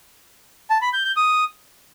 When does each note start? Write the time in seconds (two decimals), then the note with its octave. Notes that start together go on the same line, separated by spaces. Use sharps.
0.70 A5
0.82 B5
0.93 G6
1.05 G6
1.16 D#6